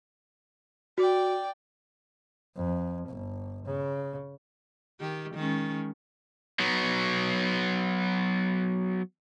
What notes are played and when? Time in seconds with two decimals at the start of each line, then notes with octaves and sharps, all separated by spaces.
0.98 F#4 D5 G5
2.56 F2
3.09 G1
3.66 C#3
5.00 D#3 G4
5.34 D#3 G#3 C#4
6.60 F#3 B3